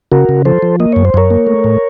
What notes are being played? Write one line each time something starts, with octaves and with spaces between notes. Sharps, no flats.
C#3 F#4 A#4
C#3
F3 A4 C5
F3
A#3 D#5
F#2 C#5
C5
F#2 A#4 C#5
A#3
A3
A2